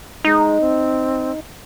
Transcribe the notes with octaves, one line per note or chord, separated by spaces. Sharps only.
G#3 D#4
C4